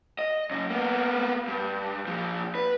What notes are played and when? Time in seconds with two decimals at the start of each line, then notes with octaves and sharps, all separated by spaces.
0.19 D#5
0.51 F#2 C#3
0.70 A#3 B3
1.47 G2
2.07 A#2 F3
2.55 B4